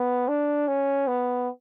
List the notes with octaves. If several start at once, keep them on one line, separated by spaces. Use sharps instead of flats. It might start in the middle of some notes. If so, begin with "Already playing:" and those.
Already playing: B3
D4
C#4
B3